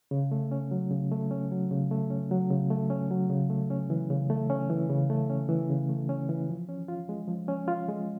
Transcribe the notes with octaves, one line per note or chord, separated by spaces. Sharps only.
C#3
A3
C#4
F#3
C#3
A3
C#4
F#3
C#3
A3
C#4
F#3
C#3
A3
C#4
F#3
C#3
A3
C#4
E3
C#3
A3
C#4
E3
C#3
A3
C#4
E3
C#3
A3
C#4
E3
F3
C#4
F4
G#3
F3
C#4
F4
G#3